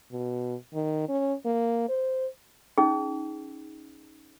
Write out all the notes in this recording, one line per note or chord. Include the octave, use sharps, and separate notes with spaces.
B2
D#3
C#4
A#3
C5
C#4 D#4 G#4